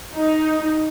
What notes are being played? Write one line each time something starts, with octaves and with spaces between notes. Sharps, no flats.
D#4